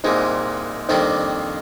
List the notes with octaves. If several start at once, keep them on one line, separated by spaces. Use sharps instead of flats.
C2 A#2 G#3 C4 D#4
F2 D#3 G3 A#3 C4 D4 D#4